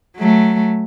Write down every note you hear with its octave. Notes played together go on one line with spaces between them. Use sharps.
F#3 A3